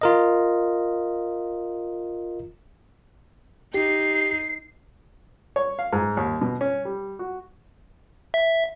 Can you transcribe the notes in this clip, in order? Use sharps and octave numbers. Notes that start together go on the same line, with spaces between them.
F4 A#4 D#5
D#4 G4 C7
C#5
F5
G#2
D#2
B2
C#4
G3
F#4
E5